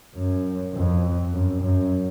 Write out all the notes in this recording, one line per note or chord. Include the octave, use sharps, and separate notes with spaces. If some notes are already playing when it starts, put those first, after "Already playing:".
F#2
F2
F#2
F#2